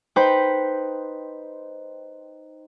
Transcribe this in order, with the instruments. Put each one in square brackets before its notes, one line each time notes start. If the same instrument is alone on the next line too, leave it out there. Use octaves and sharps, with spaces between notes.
[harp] D#4 B4 C5 G5 B5